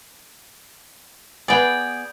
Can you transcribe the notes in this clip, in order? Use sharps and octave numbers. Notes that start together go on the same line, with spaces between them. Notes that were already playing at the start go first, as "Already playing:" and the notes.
B3 G#4 D5 G5